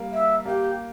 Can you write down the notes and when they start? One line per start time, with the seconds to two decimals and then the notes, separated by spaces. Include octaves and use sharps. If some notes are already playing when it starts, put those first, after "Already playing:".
Already playing: G3 A#3
0.12 E5
0.45 A#3 G4